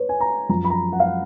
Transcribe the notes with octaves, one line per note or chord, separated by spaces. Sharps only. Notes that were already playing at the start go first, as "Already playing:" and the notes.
Already playing: B4 C#5
G#5
A#5
F#2 F3 A#5
B5
A#5
F#5
F5
F#5